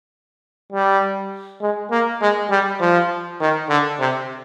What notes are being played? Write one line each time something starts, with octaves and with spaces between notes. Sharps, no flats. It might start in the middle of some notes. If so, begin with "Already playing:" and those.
G3
G#3
A#3
G#3
G3
F3
D#3
D3
C3